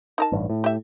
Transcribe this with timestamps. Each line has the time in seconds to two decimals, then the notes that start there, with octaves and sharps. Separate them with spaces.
0.18 D#4 A#4 A5
0.32 A1 G2
0.50 A2
0.64 G4 E5